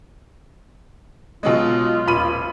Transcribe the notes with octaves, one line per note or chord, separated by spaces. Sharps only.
B2 F#3 G#3 F4
D#1 B5 D#7